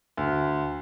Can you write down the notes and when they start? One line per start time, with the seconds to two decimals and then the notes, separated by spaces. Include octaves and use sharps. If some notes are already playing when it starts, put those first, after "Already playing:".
0.17 D2